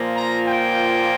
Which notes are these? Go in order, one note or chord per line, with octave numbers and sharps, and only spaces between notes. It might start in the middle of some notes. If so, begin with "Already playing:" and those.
Already playing: A#2 F3 A#3 F4
A#5
G5